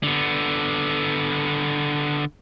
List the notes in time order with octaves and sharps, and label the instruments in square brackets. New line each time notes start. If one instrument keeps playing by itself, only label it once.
[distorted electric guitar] D3 B3